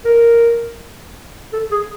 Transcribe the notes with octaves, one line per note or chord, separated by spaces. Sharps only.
A#4
A4
G#4